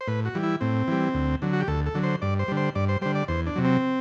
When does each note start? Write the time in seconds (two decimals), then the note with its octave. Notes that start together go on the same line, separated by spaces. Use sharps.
0.01 C5
0.07 A2 B4
0.25 F#4
0.35 E3 G3
0.43 E4
0.61 A2 C4
0.88 E3 G3
1.14 D2
1.42 D3 F#3
1.53 F#4
1.60 G4
1.68 D2 A4
1.86 A4
1.94 D3 F#3
2.03 C5
2.22 G2 D5
2.39 C5
2.48 D3 G3
2.57 C5
2.75 G2 D5
2.89 C5
3.01 D3 G3 C5
3.15 D5
3.28 E2 C5
3.46 D4
3.56 C3 F#3
3.65 C4